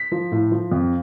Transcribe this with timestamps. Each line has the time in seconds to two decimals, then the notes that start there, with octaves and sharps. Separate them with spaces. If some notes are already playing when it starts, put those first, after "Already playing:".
Already playing: B6
0.12 F3
0.32 A2
0.51 F3
0.72 F2